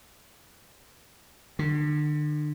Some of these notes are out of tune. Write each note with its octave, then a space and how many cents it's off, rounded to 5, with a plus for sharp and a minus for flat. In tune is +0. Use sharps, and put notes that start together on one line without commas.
D3 +35